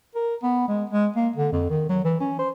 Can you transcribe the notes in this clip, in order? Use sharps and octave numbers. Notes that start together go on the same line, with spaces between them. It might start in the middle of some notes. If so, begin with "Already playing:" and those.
A#4
B3
G#3
G#3
A#3
D3
F2
D#3
F#3
E3
C#4
C5